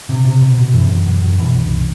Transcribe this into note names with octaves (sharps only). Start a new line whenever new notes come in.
C3
C3
B2
B2
F#2 E3
F#2
F#2
F#2
B2 E3
C2